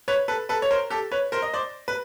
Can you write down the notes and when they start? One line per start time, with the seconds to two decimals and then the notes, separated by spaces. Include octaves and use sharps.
0.08 B4 C#5
0.28 A4 B4
0.49 A4 B4
0.62 C#5
0.71 A#4 C5
0.90 G4 A4
1.12 B4 C#5
1.32 A#4 C5
1.42 D#5
1.54 C5 D5
1.88 B4